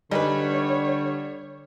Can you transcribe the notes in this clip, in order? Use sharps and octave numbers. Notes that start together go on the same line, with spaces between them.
D3 G3 D#4 G#4 B4 C#5